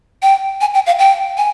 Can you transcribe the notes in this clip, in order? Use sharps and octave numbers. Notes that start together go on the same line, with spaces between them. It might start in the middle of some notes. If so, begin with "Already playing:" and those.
G5
G#5
G5
F5
G5
G#5